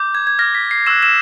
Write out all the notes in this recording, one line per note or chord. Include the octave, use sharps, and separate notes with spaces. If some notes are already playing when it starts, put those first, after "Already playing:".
Already playing: D6 G6
G#6
G#6
D6 F6 A#6
B6
C7
C#6 E6 F#6 E7
E6 E7